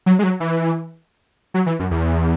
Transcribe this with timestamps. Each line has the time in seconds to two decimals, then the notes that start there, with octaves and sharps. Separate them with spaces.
0.06 F#3
0.19 G#3
0.23 F#3
0.40 E3
1.54 F#3
1.66 E3
1.79 F#2
1.91 E2